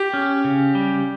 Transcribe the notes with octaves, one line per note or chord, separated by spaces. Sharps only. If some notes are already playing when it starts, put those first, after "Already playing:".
Already playing: G4
C#4
C#3
G3